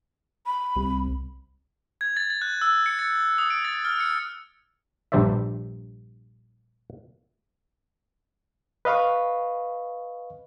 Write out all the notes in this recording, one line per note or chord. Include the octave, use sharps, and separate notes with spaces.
B5
C2
G#6
A6
A6
F#6
E6
C#7
A6
D#6
D7
A6
F6
C#7
A#1 G2 G3 C5 D5 E5
B4 D#5 F5 B5 C#6